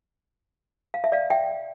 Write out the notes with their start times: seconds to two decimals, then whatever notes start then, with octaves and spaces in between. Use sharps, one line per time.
0.94 F5
1.04 E5
1.12 D5 F5
1.30 E5 G5